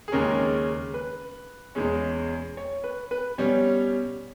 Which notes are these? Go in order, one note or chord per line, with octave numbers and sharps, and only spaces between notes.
G#4
D#2 C#3 G#3 C#4 A#4
B4
E2 B2 G#3 C#4
C#5
B4
B4
B2 G3 C#4 C#5